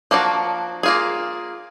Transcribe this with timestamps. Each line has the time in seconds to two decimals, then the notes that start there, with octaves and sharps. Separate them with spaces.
0.11 F3 A#3 D4 F#4
0.83 A#3 F4 G#4